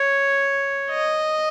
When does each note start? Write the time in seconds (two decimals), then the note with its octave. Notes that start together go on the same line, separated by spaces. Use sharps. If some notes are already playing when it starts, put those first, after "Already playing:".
Already playing: C#5
0.91 D#5